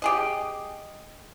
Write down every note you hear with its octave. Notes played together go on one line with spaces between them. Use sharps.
G4 G#4 D#5